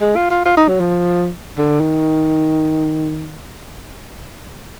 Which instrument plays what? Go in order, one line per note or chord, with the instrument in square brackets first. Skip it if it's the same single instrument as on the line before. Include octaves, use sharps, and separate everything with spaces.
[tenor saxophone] G#3
F4
F4
F4
D#4
F#3
F3
D3
D#3